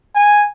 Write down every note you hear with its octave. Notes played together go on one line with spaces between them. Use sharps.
G#5